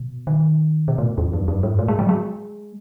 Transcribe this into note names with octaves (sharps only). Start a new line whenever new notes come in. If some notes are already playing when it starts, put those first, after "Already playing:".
Already playing: B2
D#3
B2
A2
E2
F#2
F#2
G#2
A2
G#3
F#3
G#3